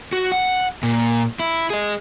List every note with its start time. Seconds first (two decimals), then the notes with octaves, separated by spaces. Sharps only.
0.13 F#4
0.32 F#5
0.83 A#2
1.40 E4
1.70 G#4 D#5